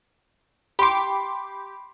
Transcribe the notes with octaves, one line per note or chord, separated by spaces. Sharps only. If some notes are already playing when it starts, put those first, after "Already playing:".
G4 B5 C6 D6